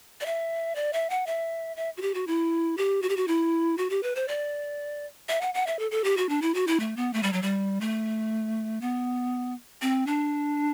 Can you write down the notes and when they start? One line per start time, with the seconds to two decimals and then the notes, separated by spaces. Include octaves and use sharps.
0.21 D5
0.26 E5
0.75 D5
0.93 E5
1.10 F#5
1.27 E5
1.77 E5
1.97 F#4
2.02 G4
2.14 F#4
2.27 E4
2.77 G4
3.02 F#4
3.09 G4
3.17 F#4
3.28 E4
3.78 F#4
3.90 G4
4.03 B4
4.15 C5
4.28 D5
5.29 E5
5.41 F#5
5.54 F#5
5.67 E5
5.79 A4
5.91 A4
6.04 G4
6.17 F#4
6.29 D4
6.42 E4
6.54 F#4
6.67 E4
6.80 A3
6.97 B3
7.13 A3
7.23 G3
7.33 F#3
7.42 G3
7.81 A3
8.81 B3
9.82 C4
10.07 D4